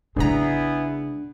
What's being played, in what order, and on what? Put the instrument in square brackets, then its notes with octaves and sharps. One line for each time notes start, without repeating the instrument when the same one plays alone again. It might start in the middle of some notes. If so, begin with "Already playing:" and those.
[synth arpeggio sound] A1 A#5 [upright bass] C#3 G#3 [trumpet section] B3 E4 G#4 [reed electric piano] D4